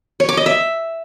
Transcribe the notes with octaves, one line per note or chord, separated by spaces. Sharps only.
C#5
D6
D#5
E5